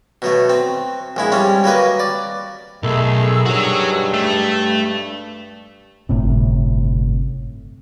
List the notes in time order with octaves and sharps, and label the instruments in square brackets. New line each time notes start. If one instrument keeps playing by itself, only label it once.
[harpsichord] B2 F#3 A3
C4
A#1 G#3 E4
G3 C4 C#4
F#3 A#3 B4 D#5
D5
[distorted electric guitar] B1 [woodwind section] D#3 G#4 E6 [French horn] A3
[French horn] G2 [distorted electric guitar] F#4 C#5
[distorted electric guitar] A3
[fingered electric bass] G1 A2 C3